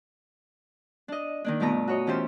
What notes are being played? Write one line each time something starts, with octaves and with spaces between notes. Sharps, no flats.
D4 D#5
D#3 A#3 D4
G2 B2 A3 F4 B4 A#5
F#4 C#5 D#5
E3 C#4 F4 G4 C5